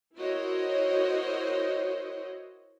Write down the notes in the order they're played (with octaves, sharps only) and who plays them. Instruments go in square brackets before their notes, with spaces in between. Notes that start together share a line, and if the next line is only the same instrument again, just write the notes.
[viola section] E4 F#4 A#4 C5 C#5 D#5